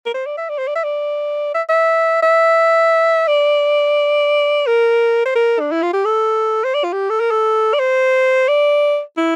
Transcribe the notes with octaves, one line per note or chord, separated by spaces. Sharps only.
A#4
C5
D5
E5
D5
C5
D5
E5
D5
E5
E5
E5
D5
A#4
C5
A#4
D4
E4
F4
G4
A4
C5
D5
F4
G4
A4
A#4
A4
D5
C5
D5
E4